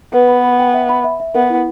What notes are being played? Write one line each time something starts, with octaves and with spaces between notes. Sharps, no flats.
B3 B4
B5
B5
G5
E5
B5
E5
E5
B3 A#4
E4